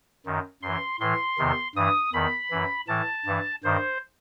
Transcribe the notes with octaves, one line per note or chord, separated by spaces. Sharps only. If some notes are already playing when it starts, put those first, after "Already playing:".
F#2 D#3
F#2 E3 C6
A2 E3 C6
E2 C3 D#3
G2 E3 D#6
E2 D#3 B5
F#2 E3
A2 E3 A5
G2 E3
G2 D#3 C5